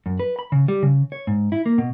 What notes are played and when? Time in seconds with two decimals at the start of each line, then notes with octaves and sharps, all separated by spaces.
0.06 F#2
0.20 B4
0.39 B5
0.52 C#3
0.68 G3
0.83 C#3
1.12 C#5
1.27 G#2
1.52 E4
1.66 A#3
1.78 B2